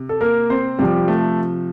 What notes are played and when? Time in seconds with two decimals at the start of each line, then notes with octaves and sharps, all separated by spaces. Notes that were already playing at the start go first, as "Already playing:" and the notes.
Already playing: C3
0.09 A4
0.21 A#3 A#4
0.50 C4 C5
0.79 C3 F3 G3 G4
1.08 A3 A4